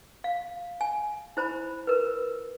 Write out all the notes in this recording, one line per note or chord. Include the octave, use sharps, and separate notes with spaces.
F5
G#5
E4 C5 A#5 B5
A#4 B4